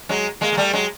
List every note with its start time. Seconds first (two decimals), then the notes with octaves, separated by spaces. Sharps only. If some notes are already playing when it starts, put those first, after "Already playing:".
0.09 F#3 G#3
0.41 G#3 A#3
0.52 A#3
0.57 G3 A3
0.73 F#3 G#3